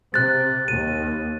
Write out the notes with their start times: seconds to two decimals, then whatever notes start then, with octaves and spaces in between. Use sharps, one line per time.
0.14 C3 F#6 A6
0.68 D#2 D#7